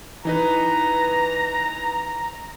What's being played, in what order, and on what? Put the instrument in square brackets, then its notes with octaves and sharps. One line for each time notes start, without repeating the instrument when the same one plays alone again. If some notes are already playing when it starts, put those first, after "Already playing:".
[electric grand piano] E3 D#4 B4 [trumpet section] A#5